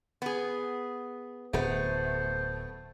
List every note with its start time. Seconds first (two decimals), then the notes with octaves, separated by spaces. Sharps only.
0.22 B3 G#4
1.53 D1 A3 B3 C5